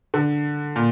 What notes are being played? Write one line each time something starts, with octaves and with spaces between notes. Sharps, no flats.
D3
A#2